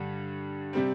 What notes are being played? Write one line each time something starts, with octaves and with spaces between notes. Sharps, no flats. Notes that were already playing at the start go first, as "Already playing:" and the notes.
Already playing: G2 D3 G3
C3 G3 C4